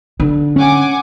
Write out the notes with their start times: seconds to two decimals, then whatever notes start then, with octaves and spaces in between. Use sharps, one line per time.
0.20 D3
0.56 C#4 F#5 G#5 D6